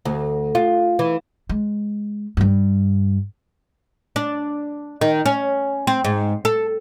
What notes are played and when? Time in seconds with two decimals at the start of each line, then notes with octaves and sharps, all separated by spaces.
0.05 D2
0.55 F4
0.99 E3
1.49 G#3
2.37 G2 G3
4.16 D4
5.01 D#3
5.26 C#4
5.87 C4
6.05 G#2
6.45 A4